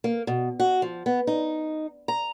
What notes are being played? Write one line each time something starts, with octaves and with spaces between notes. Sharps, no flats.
A#3
B2
F#4
F3
B3
D#4
A#5